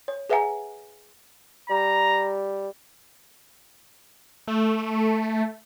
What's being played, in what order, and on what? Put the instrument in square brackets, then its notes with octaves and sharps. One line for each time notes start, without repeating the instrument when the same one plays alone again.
[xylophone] C#5
G#4 B4 E5 F#5 G#5 A#5
[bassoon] G3 [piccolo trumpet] A#5
[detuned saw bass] A3